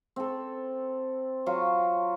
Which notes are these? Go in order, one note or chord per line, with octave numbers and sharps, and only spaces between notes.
C4 A4
F#3 F4 C#6